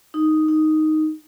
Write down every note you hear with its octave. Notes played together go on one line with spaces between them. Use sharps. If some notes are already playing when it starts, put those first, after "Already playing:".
D#4
D#4